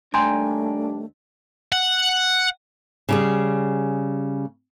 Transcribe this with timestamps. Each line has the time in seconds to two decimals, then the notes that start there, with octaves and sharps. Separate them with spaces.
0.14 D#2 G3 A3 D4 G5 G#5 A#5 C6
1.72 F#5
3.09 C#3 G3 G#4